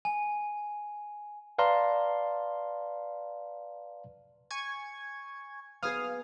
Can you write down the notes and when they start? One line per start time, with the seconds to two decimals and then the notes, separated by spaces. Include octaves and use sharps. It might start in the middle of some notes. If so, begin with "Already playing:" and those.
0.05 G#5
1.58 B4 D5 F5 A5 A#5 C6
4.51 G#5 C#6 G#6
5.83 B3 G#4 F5 D#6 F6